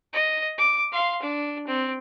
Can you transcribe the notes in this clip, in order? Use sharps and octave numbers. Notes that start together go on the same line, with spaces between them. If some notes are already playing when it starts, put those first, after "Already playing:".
D#5
D6
F5 C6
D4
C4